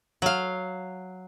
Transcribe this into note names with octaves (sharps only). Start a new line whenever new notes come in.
F#3 F5